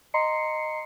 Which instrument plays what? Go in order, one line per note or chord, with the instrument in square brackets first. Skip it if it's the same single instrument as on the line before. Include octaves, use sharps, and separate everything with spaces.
[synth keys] D#5 A#5 C6 C7 C#7